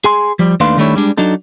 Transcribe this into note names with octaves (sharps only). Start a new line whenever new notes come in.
G#4 G#5 C6
F3 G3
D#2 A3 D4 B4 F5 C6
D#3 G3 A3 D4 E4 C#5
G3 G#3 D4
F#3 D4 D#4 A4